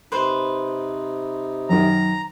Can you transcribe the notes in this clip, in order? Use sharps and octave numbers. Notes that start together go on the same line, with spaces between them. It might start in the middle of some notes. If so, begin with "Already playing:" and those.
C3 D#4 B4 C5
F#2 D#3 A#5